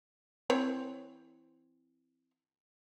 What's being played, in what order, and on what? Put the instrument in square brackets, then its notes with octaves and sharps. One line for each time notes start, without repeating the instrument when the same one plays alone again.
[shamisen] E3 C4 C#5